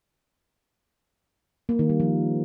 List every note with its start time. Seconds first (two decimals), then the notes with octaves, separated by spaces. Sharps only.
1.69 A#3
1.79 D#3
1.89 G3
2.00 F3